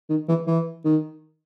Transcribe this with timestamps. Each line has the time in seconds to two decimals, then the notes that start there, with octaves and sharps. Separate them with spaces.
0.09 D#3
0.28 E3
0.47 E3
0.85 D#3